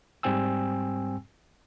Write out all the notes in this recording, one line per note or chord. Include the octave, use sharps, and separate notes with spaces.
G#2 G3 C4 G5 G#5 E6